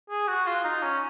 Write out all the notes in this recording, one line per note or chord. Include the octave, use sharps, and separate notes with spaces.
G#4
F#4
F4
D#4
C#4